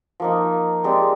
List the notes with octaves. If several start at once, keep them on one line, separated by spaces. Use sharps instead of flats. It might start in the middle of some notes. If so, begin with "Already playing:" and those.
F3 A#3 D#4
G#3 C4 G4 D5